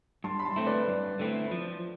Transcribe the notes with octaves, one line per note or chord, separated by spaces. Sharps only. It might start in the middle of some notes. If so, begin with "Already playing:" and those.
G2 A5 C6
B5
A5 C6
D3 A3 C4 E4
B4 D5
G2
D3 A3 C4 E4
F3